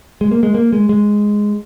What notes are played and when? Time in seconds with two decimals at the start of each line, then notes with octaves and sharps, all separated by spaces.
0.21 G#3
0.31 A#3
0.43 G#3
0.54 A#3
0.73 G#3
0.89 G#3